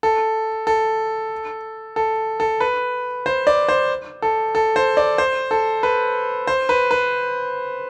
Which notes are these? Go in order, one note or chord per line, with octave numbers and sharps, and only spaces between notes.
A4
A4
A4
A4
B4
C5
D5
C5
A4
A4
C5
D5
C5
A4
B4
C5
B4
B4